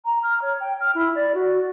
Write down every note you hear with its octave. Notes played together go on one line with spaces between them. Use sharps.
A#5
F6
C#5
G5
F6
E4
D5
F#4